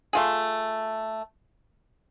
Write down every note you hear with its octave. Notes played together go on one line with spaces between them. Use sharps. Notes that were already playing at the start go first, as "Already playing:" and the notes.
A3 F4 G#4